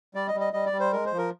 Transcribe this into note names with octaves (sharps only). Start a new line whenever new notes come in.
G3 D5
D#5
G3
D#5
G3 D#5
D5
G3
C5
G#3 A#4
C5
F3
A#4